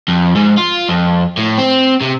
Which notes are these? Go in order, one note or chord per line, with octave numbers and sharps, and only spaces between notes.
F2
G#2
F4
F2
A2
C4
C3